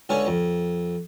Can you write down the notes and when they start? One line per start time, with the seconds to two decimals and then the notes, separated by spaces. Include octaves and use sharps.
0.09 C#2 D3 C#4 C#6
0.27 F2